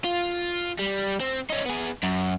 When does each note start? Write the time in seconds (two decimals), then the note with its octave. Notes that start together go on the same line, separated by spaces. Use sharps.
0.04 F4
0.79 G3
1.20 C4
1.50 C#4 D#4
1.66 B3 G#4
2.03 F#2